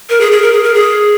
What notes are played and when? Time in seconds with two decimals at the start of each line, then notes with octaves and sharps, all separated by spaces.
0.10 A#4
0.20 G#4
0.32 G#4
0.42 A#4
0.53 G#4
0.63 A#4
0.74 G#4